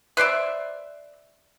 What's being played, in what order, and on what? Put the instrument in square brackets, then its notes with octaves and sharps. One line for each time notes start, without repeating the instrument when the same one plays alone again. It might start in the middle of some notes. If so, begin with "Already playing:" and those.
[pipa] B4 C5 D5 E5